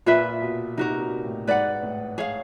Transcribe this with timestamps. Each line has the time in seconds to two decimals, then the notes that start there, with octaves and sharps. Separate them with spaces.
0.06 A#2 F4 G#4 B4 E5
0.42 B2
0.77 C3 D#4 F#4 A#4
1.00 B2
1.24 A2
1.47 G#2 B4 D5 F#5
1.83 A2
2.18 G#4 C#5 F5